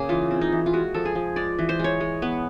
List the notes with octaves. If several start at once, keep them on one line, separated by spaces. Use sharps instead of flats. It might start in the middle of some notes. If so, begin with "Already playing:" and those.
Already playing: C#3 A#3 G#4
E3 F4
C4
D#4
E3
F4
G#3 F#4
F3 A4
G#4
F3
G#3 D5
E3
C5
G#3 C#5
G#3
B3